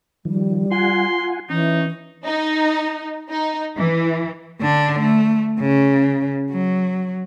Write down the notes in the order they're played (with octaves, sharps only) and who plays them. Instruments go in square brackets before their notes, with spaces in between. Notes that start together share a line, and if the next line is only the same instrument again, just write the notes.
[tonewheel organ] D#3 F3 [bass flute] G3
[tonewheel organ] F4 F#5 G#5 [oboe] C6
[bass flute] E3 [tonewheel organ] C#4 [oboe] D#4
[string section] D#4
D#4
E3
[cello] D3 D4
A3
C#3
F#3